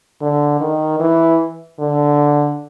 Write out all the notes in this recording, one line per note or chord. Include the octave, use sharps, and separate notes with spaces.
D3
D#3
E3
D3